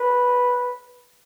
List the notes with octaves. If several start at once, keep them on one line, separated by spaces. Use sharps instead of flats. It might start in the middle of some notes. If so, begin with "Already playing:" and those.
Already playing: B4